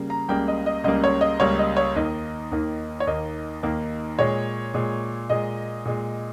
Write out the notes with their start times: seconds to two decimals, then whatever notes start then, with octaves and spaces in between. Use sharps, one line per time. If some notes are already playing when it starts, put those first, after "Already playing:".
Already playing: C#3 G3 A#3
0.10 A#5
0.28 C#2 C#3 G3 A#3 G5
0.48 D#5
0.66 D#5
0.84 C#2 C#3 G3 A#3 D#5
1.04 C#5
1.21 D#5
1.40 C#2 C#3 G3 A#3 C#5
1.59 D#5
1.77 C#5
1.96 D#2 D#3 A#3 D#5
2.52 D#2 D#3 A#3
3.00 C#5
3.07 D#2 D#3 A#3 D#5
3.63 D#2 D#3 A#3
4.19 A#2 G#3 C#5
4.74 A#2 G#3
5.30 A#2 G#3 D#5
5.85 A#2 G#3